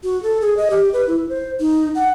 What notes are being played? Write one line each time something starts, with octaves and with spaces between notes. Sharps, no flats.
F#4
A4
G#4
D#5
G4
B4
E4
C5
D#4
F#5